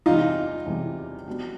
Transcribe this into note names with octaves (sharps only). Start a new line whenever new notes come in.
E2 C3 E3 G3 D#4 F4
E2 C3 E3 G3
G3 B3 D4 F#4